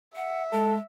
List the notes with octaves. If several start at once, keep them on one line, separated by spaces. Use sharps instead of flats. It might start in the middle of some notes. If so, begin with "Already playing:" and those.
E5 F#5
G#3 A4